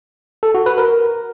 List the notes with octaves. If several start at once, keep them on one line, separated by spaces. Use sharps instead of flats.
A4
F#4
B4
A#4